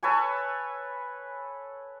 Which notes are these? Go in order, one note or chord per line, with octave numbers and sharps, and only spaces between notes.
A4 B4 C#5 G#5